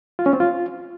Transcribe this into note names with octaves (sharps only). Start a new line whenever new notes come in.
F4
C#4
C4
F4